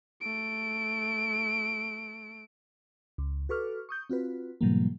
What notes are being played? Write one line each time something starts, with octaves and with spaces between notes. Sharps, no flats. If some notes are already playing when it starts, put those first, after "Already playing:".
A3 D7
C#2
F#4 A4 B4 C#6 D6 F6
C#6 D#6 G6
C4 F4 F#4 B4
G#2 B2 E3 F#3 G3 A#3